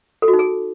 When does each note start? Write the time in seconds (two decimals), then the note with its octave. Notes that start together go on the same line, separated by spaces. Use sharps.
0.22 A4
0.28 F#4
0.33 D#4
0.39 G#4